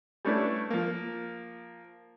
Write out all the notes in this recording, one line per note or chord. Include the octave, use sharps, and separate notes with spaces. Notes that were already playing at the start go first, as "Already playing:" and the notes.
G3 A3 C#4 D4 E4 B4
F3 A#3